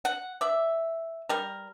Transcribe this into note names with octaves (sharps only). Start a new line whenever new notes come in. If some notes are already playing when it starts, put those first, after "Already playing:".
F#5
D5 E5
G3 A#4